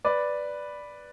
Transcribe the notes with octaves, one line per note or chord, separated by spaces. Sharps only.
B4 D5